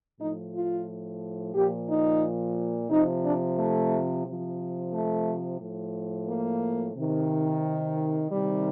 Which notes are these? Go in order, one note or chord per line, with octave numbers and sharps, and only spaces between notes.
A2 F3 D#4
F4
A#2 F3 G4
D#4
C3 F3 D#4
D4
A3
C3 F3
A3
A2 F3
A#3
C3 D#3
C3 D#3 G3